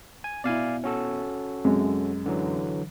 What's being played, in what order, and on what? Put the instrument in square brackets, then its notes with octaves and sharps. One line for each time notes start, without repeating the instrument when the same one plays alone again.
[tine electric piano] G#5
[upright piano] B2 E4 [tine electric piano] D5 F5 G#5
[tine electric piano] C#4 F#4 A4
[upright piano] F#2 C3 G#3
[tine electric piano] D3 E3 F#3